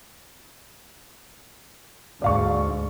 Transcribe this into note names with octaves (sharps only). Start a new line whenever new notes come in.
D2 G#2 D5 F5 C#6